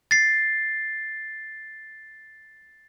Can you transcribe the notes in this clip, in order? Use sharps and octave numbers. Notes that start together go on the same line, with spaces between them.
A6 C7